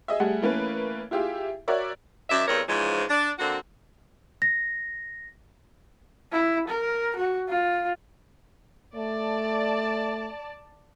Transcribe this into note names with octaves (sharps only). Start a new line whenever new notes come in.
G#4 D#5 E5
G3 A3 G#4 F#5
E3 A3 A#3 C#4 B4
E4 F4 G4 G#4 E5
F#4 A#4 C#5 D5 E5
F#2 D#3 D5 E5
E2 G2 C4 A#4 C#5
G#2 C#3 E3 F3 G#3
D4
D3 A#3 C4 F#4
A#6
E4
A#4
F#4
F4
A3 D5 A5